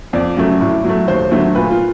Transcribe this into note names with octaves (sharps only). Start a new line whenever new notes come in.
F2 D5
C#3 F#3 A3
A2
F#3 A3
D#2 C5
D3 F#3 A3
A#2 B4
F4